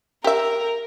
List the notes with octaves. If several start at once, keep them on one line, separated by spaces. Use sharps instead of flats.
G4 A#4 E5